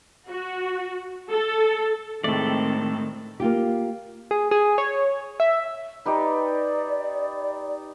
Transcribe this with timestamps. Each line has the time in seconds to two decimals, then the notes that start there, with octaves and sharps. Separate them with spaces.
0.28 F#4
1.30 A4
2.24 A2 D#3 G#3 A3 C4 A4 D5
3.40 A#3 F4 G4
4.31 G#4
4.51 G#4
4.78 C#5
5.40 E5
6.06 D#4 G4 B4 D5